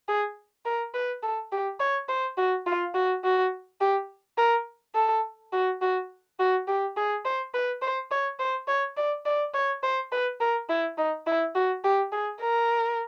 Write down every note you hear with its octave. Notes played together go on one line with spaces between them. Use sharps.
G#4
A#4
B4
A4
G4
C#5
C5
F#4
F4
F#4
F#4
G4
A#4
A4
F#4
F#4
F#4
G4
G#4
C5
B4
C5
C#5
C5
C#5
D5
D5
C#5
C5
B4
A#4
E4
D#4
E4
F#4
G4
G#4
A#4